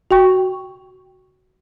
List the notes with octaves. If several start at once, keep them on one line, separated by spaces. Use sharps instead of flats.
F#4 G5 C#6